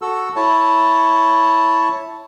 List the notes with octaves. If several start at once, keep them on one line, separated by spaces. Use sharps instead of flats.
F#4 A4 E6
E4 C#5 A5